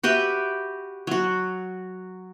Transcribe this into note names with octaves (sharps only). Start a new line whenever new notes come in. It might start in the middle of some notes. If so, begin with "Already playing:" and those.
F#4 G4 B4 E5
F#3 F#4